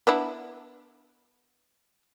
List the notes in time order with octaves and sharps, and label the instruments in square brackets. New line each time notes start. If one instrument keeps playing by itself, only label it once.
[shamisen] B3 D4 E4